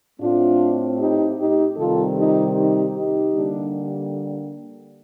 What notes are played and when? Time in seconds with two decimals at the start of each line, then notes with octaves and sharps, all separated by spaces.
0.20 A2 A3 C4 D4 F4
0.98 D#4 G4
1.38 D#4 G4
1.77 C3 D#3 G3 C4 F4 A4
2.16 D#4 G4
2.56 D#4 G4
2.95 D#4 G4
3.34 D3 G3 A#3 D4